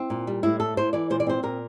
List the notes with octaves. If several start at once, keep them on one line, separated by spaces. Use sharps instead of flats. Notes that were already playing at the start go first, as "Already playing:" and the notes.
Already playing: C4 E4
A#2
G3
A2 E4
A3 A4
A2 C5
E3 D5
A#2 C5
D5
C4 C5
A#2 A#4